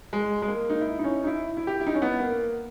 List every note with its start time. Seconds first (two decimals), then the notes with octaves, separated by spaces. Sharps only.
0.13 G#3
0.42 G#3
0.48 A#3
0.70 D#4
0.81 E4
0.99 D#4
1.04 C#4
1.24 D#4
1.27 E4
1.57 E4
1.67 G4
1.80 E4
1.87 D#4
1.94 C#4
2.02 B3
2.20 A#3